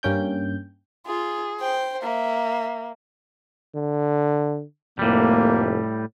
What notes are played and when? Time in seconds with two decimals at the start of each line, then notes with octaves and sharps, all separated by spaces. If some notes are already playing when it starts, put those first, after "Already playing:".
0.03 G2 A#3 C#4 G5 G6
1.06 F4 G#4
1.61 C5 G5
2.02 A#3 E5
3.75 D3
4.99 F1 A2 G3 A#3